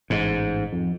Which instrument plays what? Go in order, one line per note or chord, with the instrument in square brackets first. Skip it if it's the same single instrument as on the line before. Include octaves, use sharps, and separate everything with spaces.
[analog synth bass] A1 [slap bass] G#2
[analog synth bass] F2